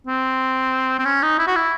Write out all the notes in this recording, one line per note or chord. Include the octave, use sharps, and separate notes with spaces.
C4
C4
C#4
D#4
E4
F#4
E4